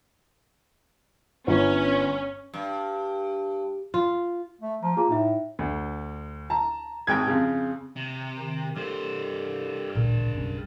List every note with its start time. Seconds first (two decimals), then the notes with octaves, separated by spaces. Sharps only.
1.47 G1 C#4
2.54 G2
3.94 F4
4.61 A3
4.83 F3 A#5
4.97 A#3 F4 G#4 A#5
5.10 A2 D#4 E5
5.59 D2
6.50 A5 A#5
7.07 G#1 G#2 G5 G#6
7.27 F2 C#3
7.96 C3
8.39 D#3
8.76 G2 G4 A4 A#4 C5
9.95 A1 D2 A#2 C#3 A#4
10.35 F#1 B1 C#4